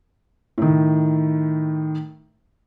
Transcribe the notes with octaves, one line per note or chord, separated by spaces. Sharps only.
A2 D#3